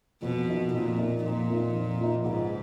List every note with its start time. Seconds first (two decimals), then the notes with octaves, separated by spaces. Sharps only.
0.22 F2 B2
0.48 F3 A#3 D#4
0.74 F2 A#2
0.98 F3 A#3 D#4
1.24 F2 A#2
1.50 F3 A#3 D#4
1.75 F2
2.01 F3 A#3 D#4
2.25 C#2 G#2